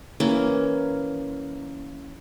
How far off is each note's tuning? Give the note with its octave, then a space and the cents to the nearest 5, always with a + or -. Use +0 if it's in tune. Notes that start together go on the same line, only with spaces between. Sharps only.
E3 +0 A#3 +0 C#4 +10